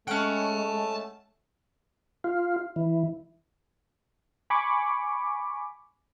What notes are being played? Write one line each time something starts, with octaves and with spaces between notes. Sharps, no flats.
G#3 A3 C#4 F#5 G5 A5
F4
E3
G#5 B5 C#6 D6